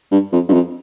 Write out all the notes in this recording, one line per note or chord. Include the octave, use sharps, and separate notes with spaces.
G2
F2
G2
F2